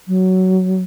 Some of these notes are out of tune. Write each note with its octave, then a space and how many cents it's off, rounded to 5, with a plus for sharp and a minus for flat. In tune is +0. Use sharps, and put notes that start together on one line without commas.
F#3 +10